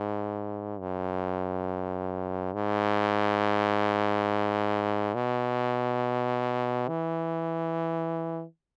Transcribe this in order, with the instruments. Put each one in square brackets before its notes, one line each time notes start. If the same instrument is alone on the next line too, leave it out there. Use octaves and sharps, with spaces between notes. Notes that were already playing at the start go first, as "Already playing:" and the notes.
Already playing: [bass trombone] G#2
F#2
G#2
B2
E3